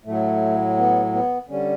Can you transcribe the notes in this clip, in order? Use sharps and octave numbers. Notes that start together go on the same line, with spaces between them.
A2 F#3 A3
B3
B3
D3 G3 C#4